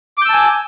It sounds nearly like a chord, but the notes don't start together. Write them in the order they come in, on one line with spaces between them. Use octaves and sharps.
D6 G6 E6 A5 G#5